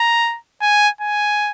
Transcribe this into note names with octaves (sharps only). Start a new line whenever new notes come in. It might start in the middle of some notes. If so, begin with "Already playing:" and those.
Already playing: A#5
G#5
G#5